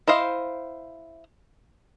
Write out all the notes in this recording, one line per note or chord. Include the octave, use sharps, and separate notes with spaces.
E4 C5 D#5 F5